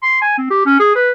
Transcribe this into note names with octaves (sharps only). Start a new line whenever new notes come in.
C6
G#5
C4
G4
C#4
G#4
B4